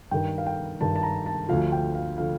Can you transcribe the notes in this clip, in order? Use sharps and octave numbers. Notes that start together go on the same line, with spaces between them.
G2 D#3 G5
F5
G5
G2 D#3 A5
A5
A#5
A5
D2 D3 F3 F5
G5
F5
D3 F3 F5